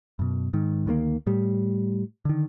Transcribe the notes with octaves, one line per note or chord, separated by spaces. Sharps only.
F#2 B2
G#2 D#3
D2 D#3 A3 A#3
A2 G3
D3 D#3